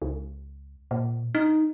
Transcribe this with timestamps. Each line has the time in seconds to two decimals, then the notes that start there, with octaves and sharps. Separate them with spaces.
0.02 C#2
0.91 A#2
1.35 D#4